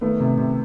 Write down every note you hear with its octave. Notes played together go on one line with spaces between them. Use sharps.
D#3 A3 B3
C3
C3